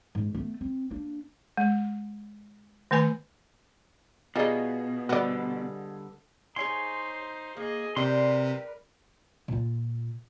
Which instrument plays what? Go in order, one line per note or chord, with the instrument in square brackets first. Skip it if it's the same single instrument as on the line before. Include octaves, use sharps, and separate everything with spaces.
[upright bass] G#2
A3 B3
C4
A#3 D4
[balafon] G#3
D#3 A3 B4 G#5 B5
[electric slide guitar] B2 [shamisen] G3 D#4 [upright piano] F4 G#4 D#5
[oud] D3 G3 B3 [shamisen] F#4 D5
[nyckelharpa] D#4 C5 [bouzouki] G#4 C#5 G#5 [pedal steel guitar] C6
[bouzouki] A#3 [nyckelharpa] G#4 D#5
[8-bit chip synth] C3 [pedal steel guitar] G4 C6 [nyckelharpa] A#4 B4 [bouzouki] D5
[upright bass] A#2 F4